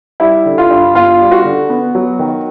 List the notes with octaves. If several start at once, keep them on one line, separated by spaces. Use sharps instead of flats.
G3 E4
D3
F4
G2
G1 F4
G3
F#4
D3
B3
F#3
D#3